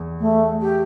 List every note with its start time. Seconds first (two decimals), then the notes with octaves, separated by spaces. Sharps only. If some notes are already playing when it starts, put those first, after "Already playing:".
Already playing: E2
0.19 A3
0.61 G4